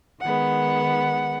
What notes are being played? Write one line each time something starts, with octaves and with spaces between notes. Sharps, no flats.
D#3 G#3 B3 F#5